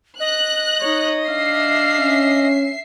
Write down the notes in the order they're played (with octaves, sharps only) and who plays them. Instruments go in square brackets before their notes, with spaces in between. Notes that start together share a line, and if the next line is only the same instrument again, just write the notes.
[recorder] D#5 [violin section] F#6
[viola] D#4 C#5
[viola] D4 F5 [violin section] E5 C7
[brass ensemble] C#4